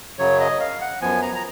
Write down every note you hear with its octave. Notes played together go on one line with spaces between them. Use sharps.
F#2 C#3 F#3 C#5
D#5
F5
F#5
F#2 F3 B3 G#5
A#5
A#5